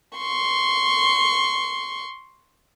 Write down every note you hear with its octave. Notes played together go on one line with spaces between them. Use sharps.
C6 C#6